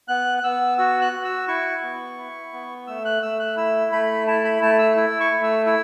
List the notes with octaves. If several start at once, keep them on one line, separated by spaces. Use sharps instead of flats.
B3 F#6
F#6
B3 E6
F#4 E6
F#6
F#4
E6
E4 C#6
B3
E4
B3
A3 E6
F#6
A3 E6
F#6
E4 E6
A3 B5
E4 A5
B5
A3 A5
E6
E4 E6
C#6
A3
E6
E4 E6